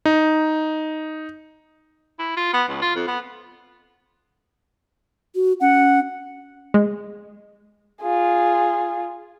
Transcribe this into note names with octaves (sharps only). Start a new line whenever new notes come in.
D#4
E4
F4
B3
C#2
F4
F2
B3
F#4
C#4 F#5
G#3
F4 G#4